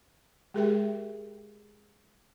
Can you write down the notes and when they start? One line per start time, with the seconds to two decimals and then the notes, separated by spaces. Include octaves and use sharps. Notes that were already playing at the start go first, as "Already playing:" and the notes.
0.54 G#3 G4 G#4 A#4 E5 G5